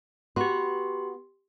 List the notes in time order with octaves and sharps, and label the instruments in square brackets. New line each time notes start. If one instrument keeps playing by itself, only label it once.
[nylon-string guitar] B3 F#4 [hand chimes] G4 C6